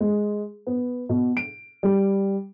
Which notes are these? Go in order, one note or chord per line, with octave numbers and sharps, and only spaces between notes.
G#3
B3
B2
D7
G3